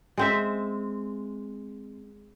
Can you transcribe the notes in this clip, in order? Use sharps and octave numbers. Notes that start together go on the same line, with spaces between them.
G#3 C4 E5